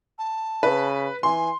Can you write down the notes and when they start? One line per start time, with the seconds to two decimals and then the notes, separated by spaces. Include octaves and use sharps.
0.18 A5
0.63 C#3 B4
1.23 E3 G#5 C6